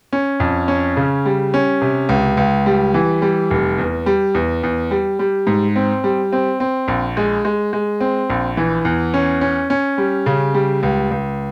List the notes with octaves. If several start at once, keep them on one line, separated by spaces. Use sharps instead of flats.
C#4
F2
C#4
C#3
G3
C#4
C3
C#2
C#2
G3
E3
G3
F1
E2
G3
E2
E2
G3
G3
G#2
C4
G3
C4
C4
A#1
G#3
G#3
G#3
C4
A#1
E3
E2
C#4
C#4
C#4
G3
C#3
G3
C#2
C#2